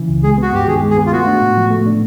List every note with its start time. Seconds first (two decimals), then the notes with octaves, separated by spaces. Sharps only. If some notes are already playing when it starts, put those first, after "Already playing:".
Already playing: C#3 E3
0.09 C#2
0.23 G#3 G#4
0.38 B3 F#4
0.53 G2 G4
0.67 D#3 G#4
0.83 G#3
0.91 G#4
0.97 B3
1.06 F4
1.12 A3 F#4
1.27 D4
1.42 A2
1.57 F3
1.71 A3
1.86 D4